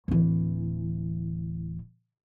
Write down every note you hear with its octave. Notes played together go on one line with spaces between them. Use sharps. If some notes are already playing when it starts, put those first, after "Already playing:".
D1 E3